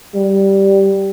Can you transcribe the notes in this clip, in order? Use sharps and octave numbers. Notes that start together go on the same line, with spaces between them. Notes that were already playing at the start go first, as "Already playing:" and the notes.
G3